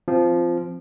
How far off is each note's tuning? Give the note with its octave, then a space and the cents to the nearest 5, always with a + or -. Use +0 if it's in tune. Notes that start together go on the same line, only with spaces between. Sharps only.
F3 -10 C4 +0